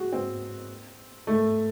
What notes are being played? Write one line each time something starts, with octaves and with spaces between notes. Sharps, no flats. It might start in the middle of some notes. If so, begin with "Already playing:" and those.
Already playing: F#4 G#4
C4
A3